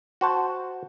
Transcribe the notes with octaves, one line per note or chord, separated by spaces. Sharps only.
F#4 C5 A5